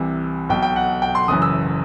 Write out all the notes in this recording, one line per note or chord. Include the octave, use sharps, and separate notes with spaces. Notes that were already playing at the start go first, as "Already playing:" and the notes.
Already playing: C2 C3 E3
B1 B2 G5
G5
F#5
G5
C6
F#1 F#2 E3 D#6
E6